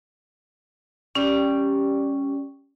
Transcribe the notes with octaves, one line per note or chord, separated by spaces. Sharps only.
G3 C#4 G4